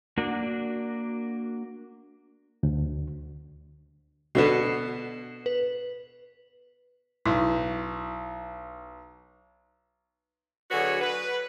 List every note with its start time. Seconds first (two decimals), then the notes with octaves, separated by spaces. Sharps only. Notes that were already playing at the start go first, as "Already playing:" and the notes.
0.18 A#3 D4 F#4
2.63 D2
4.35 B2 D3 B3 C7 E7
5.46 B4
7.26 B1 E4
10.71 D3 F#3 B3 F#4 G#4 C#5
11.02 B4